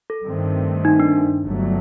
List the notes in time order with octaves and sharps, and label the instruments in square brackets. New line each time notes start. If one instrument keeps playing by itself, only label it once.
[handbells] A4
[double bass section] G2 D#3 A3 C4
[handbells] D#4
D4
[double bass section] G1 G2 F#3 A3